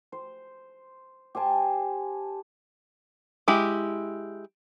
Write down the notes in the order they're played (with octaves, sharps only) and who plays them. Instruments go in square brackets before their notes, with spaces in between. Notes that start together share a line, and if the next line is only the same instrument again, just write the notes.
[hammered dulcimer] C5
G4 C5 G#5 A5
[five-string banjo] G#3 E4 G4